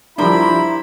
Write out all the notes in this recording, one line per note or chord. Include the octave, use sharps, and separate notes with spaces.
F3 G3 D4 E4 A#4 C5 D5 B5